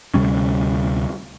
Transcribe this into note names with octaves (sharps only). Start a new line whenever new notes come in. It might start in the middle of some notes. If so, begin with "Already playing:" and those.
D2 C3 G3 C#4